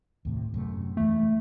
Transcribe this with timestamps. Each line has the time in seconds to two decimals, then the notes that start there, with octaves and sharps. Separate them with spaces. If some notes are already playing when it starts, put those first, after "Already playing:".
0.25 D#2 A2 C3
0.54 F#2 C3 A3
0.97 E2 E3 A3